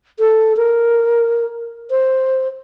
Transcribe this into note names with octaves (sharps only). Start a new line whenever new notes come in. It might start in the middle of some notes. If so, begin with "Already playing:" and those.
A4
A#4
C5